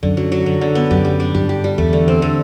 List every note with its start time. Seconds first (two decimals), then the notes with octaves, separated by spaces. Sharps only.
0.03 F#2 D3
0.17 F#3
0.32 F#3
0.46 D3
0.61 D3
0.75 B3
0.91 F#2 G4
1.05 G3
1.20 D4
1.35 G2 G4
1.49 G4
1.64 G3
1.78 E2 A3
1.93 D3
2.08 C4
2.22 D3